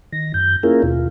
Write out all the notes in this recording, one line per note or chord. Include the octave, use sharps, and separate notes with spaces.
D#3 A#6
F#2 G6
A#3 C#4 E4 F4 G#4 A#4
D#2 B2 F4